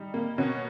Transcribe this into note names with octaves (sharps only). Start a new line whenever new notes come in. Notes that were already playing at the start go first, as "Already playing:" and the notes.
Already playing: G3 D#4
A#3
B2 C#4